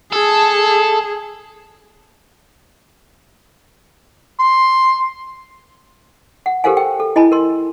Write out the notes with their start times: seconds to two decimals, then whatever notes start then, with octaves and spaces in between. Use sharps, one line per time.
0.13 G#4 A4
4.40 C6
6.46 F#5
6.64 G4 A4 A#4 C5 F5 G#5
6.77 G5
7.00 A4
7.16 E4 D#5 G#5 A5 B5
7.32 A#4 C6